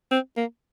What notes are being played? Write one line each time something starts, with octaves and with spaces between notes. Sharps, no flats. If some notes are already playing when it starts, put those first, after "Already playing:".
C4
A#3